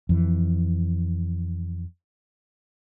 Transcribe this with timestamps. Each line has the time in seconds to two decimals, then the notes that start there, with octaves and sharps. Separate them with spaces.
0.09 F2 E3